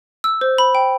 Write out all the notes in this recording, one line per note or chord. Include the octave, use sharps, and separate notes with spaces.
E6
C5
B5
G5